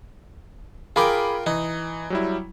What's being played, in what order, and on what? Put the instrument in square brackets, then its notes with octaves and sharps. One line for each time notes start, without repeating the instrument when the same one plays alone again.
[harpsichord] F4 A#4 G5 [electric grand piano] G#4 B5 D6
[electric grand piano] E3 [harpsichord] D#4
[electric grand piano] F#3 G3 E4